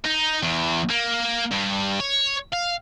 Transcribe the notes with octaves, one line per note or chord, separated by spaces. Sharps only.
D#4
E2
A#3
G2
C#5
F5